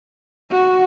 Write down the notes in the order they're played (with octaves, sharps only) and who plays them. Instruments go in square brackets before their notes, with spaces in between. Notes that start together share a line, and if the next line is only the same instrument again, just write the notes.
[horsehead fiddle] F#4